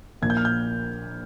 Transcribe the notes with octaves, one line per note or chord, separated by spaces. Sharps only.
A#1 A#2 F3 G#6
G6
F6
G6